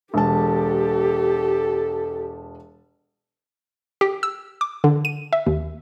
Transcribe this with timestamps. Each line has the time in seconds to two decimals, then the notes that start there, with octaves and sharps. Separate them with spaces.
0.14 E1 G4 A4 A5
4.01 G4
4.23 E6
4.61 D6
4.84 D3
5.05 D#7
5.33 E5
5.46 D#2